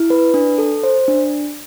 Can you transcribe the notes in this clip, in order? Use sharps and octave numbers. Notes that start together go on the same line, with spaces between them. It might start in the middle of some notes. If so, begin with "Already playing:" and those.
Already playing: E4
B4
D4
A4
C5
D4